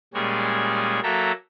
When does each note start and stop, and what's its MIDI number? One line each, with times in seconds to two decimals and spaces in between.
0.14 1.00 46
0.14 1.00 55
0.14 1.00 56
0.14 1.00 61
0.14 1.00 68
1.03 1.32 54
1.03 1.32 58
1.03 1.32 69
1.03 1.32 76
1.03 1.32 79
1.03 1.32 82